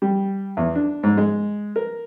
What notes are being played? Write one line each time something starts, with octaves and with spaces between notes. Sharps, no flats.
G3
E2
D4
G#2
G#3
A#4